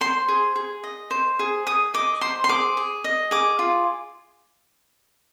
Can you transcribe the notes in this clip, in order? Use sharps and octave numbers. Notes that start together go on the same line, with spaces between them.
C5 C6
G#4
G#4
D#5
C5
G#4
G#4 D#6
D#5 D6
C5 C6
C6
G#4 D6
G#4
D#5
G#4 D6
F4